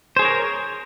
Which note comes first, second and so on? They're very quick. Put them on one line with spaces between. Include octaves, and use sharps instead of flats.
C5 G#4 C#5 A#4